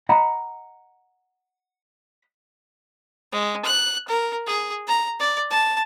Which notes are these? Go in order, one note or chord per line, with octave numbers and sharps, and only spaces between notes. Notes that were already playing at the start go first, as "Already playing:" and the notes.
D#5 F#5 A#5 B5
G#3
F#6
A#4
G#4
A#5
D5
A5